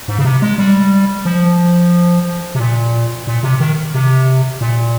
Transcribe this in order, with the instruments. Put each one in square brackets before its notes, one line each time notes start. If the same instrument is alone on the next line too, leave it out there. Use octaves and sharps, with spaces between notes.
[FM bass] G#2
C#3
C3
G#3
G3
F3
C3
A#2
A#2
C3
D#3
C3
A#2